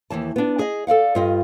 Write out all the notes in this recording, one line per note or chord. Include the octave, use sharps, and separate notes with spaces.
D#2 G#2 E3 A5
B3 D4
G#4 D#5
A4 D5 F5 F#5
G2 F4 D#5